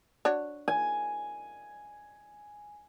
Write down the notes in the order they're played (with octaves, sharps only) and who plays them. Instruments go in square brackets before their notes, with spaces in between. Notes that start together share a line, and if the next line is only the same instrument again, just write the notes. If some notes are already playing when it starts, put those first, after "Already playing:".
[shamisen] D4 F#4 C#5
[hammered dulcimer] G#5